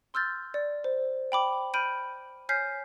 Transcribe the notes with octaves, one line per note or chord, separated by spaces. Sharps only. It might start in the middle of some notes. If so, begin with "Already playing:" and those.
C6 E6 F6 G6 A6
D5
C5
G5 B5 D6
B5 F6 G6 D7 D#7
C#5 G#5 F6 G6 B6 C7